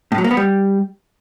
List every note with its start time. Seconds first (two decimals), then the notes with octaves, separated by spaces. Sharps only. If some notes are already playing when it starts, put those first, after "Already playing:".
0.12 A2
0.18 F#3
0.24 A#3
0.31 B3
0.37 G3